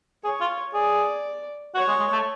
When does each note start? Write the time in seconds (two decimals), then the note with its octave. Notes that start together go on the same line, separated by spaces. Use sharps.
0.24 G#4 C#5
0.41 F4
0.74 G#4 D5
1.75 F#4 C#5
1.88 G#3
2.00 G#3
2.13 A3